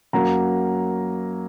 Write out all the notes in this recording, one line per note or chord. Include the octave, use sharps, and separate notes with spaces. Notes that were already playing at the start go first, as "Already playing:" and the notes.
F#2 F#3 A#3 A#5